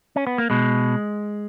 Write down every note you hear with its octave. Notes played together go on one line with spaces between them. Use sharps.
C#4
B3
A#3
B2 G#3